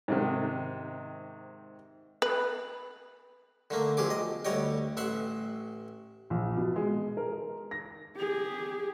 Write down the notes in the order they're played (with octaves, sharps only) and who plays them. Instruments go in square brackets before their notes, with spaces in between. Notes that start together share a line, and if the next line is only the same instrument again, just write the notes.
[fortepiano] G#2 C3 D#3
[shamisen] B4
[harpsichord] D3 A3 A#3
B1 F3 G4 G#4 D6
D#5
D2 G3 C#5 D#5 G5
A1 E5 F#5 C6
[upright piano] A#1
B2
G#3
A#4
A#6
[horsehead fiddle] G4 G#4